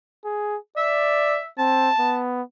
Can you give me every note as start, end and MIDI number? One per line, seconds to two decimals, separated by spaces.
0.25 0.57 68
0.77 1.40 74
0.77 1.46 76
1.58 1.90 60
1.58 2.17 81
1.99 2.42 59